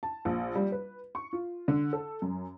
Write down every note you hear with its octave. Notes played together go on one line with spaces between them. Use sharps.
A5
A#1
G3
B4
C#6
F4
D3
A4
F#2